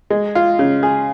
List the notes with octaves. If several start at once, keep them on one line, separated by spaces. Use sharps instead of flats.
G#3
F4
C#3
G#4